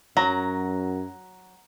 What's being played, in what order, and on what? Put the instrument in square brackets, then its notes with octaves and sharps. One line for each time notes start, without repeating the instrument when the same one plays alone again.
[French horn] F#2 [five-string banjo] F#3 [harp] A#5